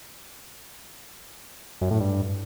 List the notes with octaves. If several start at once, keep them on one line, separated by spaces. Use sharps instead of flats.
F#2
A2
G2